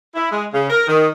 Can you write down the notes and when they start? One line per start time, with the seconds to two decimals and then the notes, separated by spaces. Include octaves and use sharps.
0.15 E4
0.31 G#3
0.53 C#3
0.70 A#4
0.87 D#3